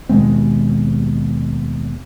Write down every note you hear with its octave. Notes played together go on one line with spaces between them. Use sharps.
D#2 B2 G#3 C4